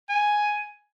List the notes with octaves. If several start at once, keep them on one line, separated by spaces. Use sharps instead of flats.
G#5